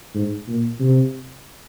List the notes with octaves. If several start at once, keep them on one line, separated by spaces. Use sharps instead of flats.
G#2
A#2
C3